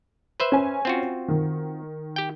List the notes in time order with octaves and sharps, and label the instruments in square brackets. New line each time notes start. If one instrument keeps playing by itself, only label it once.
[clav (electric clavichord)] B4 C5 E5
[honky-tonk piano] C#4 G#5
[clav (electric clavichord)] C4 F4 F#4
[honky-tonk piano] D#3
[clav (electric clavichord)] G4 G5